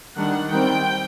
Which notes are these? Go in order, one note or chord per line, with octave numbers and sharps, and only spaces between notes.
D#3 G3 D4 F#5
D#3 G3 C4 G5